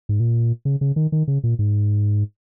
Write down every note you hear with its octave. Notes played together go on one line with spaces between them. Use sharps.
G#2
A#2
C#3
C#3
D#3
D#3
C#3
A#2
G#2